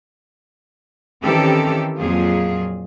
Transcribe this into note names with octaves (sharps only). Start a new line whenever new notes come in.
D#3 E3 C4 C#4 G4 A4
F2 A#2 F#3 F4 G#4